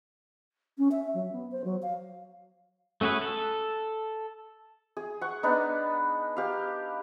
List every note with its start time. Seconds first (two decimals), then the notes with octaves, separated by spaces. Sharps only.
0.78 C#4
0.91 E5
1.14 F#3
1.32 B3
1.51 C5
1.64 F#3
1.82 F5
3.01 A3 C#4 F#4 G#4 B4
3.21 A4
4.97 G#4
5.21 F#5 C#6
5.43 B3 D4 D#4
6.37 G4 F5